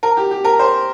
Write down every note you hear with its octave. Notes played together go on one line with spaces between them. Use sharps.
A#4
G4
G4
A#4
C5